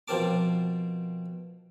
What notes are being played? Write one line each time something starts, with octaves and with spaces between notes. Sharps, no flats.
B2 F3 C4 A#4 A5 D6